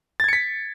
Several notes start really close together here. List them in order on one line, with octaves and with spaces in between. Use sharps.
A6 G#6 C#7 B6